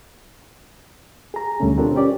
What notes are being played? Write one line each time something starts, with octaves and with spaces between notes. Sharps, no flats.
G#4 A#5
D2 B2 D3 G3 A3 C#4
C4 D4 F4 G4 A4 A#4
C#4 G4 D5